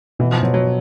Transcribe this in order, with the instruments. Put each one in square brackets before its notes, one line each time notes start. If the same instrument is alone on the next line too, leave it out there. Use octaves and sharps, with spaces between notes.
[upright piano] B2 [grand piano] E3
[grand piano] F3
[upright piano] B2 [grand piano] F#3
[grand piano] F#3